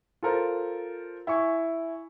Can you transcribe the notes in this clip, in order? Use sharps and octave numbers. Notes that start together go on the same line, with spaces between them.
F4 A4 A#4 C5
E4 G#5 C#6